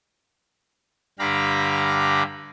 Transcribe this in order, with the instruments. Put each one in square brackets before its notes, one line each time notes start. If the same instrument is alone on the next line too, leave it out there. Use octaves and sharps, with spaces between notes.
[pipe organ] G2 D3 G4 F5 A#5 B5